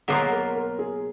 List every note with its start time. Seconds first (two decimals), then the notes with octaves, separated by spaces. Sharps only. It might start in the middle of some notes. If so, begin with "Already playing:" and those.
0.08 B2 F#3 A#3 F4 G#4
0.31 A#4
0.56 A#4
0.79 G#4